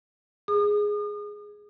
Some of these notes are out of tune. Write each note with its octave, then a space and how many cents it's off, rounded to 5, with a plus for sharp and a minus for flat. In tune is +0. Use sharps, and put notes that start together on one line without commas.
G#4 +0 D#6 -40